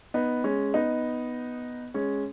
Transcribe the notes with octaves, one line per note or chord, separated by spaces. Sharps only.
B3 D#4
G#3 C#4
B3 D#4
G#3 C#4